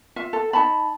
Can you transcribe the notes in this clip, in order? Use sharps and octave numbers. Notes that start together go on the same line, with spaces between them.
F4 E5
A4
D#4 A5 B5